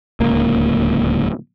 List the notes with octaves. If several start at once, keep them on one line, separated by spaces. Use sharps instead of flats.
D1 C#2 A#3